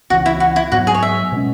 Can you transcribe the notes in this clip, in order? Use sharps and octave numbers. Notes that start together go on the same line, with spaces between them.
C#2 C#3 E3 F#4
E4
F#4
E4
G#2 F#3 B3 F#4
G#4
C#5
E5
B2 G#3 C#4